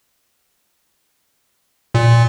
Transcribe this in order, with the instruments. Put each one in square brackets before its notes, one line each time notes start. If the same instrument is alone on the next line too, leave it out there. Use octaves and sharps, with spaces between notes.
[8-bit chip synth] A#2